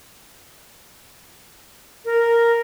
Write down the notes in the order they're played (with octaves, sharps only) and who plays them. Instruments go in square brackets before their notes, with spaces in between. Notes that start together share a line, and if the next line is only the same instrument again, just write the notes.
[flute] A#4